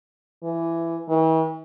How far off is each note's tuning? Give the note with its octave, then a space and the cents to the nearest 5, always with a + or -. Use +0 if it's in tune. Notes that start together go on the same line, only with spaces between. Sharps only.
E3 +15
E3 -45